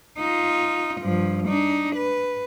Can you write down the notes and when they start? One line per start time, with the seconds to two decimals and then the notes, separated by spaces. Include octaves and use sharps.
0.18 D#4 F4
1.02 G2 F3
1.48 D4 D#4
1.96 B4